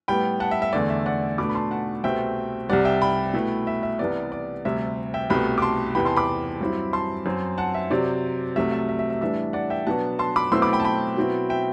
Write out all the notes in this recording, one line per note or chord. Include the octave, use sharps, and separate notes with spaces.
A2 G3 B3 G5 B5
F#5 A5
E5
E5
E2 D3 A3 D5
E5
D5 F#5
B2 A3 D4 B5 D6
B5
A5 C6
F#5 A5
C2 B2 A3 C4 E5 G5
C2 C3 G3 D5 F#5
E5 G5
G5 B5
B2 A3 E4
E5
E5
C2 C3 E3 B3 D5
D5
D2 C3 G3 E5
E5 G5
C2 B2 A3 G5 B5
D6
A5 C6
E2 C3 E3 G5 B5
A5 C6
B5 D6
G2 F#3 C4 E4
A5 C6
F#2 F#3 C4
F#5 A5
E5
C3 F#3 C4 D5
C2 C3 F#3 A3 E5
E5
E5
E5
E5
A2 E3 G3 D4 E5
D5 F#5
E5 G5
B2 F#3 B3 D4 F#5 A5
A5 C6
B5 D6
B2 F#3 A3 C4 E4 C6 E6
B5 D6
G5 B5
A5
G5 B5
B2 F#3 C4 E4
E5 G5